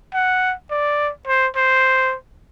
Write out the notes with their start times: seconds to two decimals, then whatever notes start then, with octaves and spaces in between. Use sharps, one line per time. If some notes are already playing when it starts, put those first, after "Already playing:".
0.14 F#5
0.70 D5
1.27 C5
1.56 C5